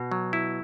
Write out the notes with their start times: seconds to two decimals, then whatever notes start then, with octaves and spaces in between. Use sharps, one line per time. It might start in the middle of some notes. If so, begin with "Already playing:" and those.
Already playing: B2
0.12 F#3
0.33 E4